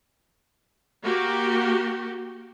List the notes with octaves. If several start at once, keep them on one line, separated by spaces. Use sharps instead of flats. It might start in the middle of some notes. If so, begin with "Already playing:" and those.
A#3 F#4 G4